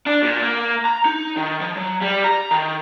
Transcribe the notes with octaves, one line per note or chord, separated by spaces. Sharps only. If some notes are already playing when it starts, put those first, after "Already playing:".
D4
A#2
A#3
A#5
D#4
D#3
F3
F#3
G3
A#5
D#3